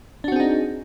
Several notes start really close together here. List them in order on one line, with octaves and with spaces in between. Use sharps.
D4 F#4 C4 G#4 D#4